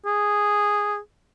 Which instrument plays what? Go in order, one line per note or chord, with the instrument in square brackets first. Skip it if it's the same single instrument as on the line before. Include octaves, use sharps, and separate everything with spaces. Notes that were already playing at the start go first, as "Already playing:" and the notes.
[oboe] G#4